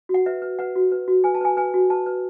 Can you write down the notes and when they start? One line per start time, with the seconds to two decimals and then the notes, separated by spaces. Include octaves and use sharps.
0.09 F#4
0.14 F#5
0.26 B4 E5
0.42 B4
0.59 B4 F#5
0.76 F#4
0.92 B4
1.08 F#4
1.24 B4 G#5
1.35 A5
1.41 B4 G#5
1.57 B4 G#5
1.74 F#4
1.90 B4 A5
2.06 B4